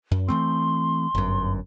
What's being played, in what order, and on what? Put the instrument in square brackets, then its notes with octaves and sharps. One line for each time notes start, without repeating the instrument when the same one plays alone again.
[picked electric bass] F#2
[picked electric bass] E3 A3 C4 [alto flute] C6
[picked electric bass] G1 F#2